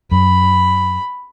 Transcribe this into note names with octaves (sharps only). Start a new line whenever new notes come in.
F#2 B5